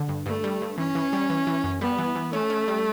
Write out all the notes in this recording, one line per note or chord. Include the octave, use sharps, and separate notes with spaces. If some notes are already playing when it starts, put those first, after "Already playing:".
Already playing: D3
G2
G2 A3
G3
G2
E3 C#4
E3
G3
E3
E3
F#2
G3 B3
E3
E3
A3 C#4
C#4
G3